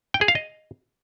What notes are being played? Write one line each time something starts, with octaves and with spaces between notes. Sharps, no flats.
G5
G#4
F5
D#5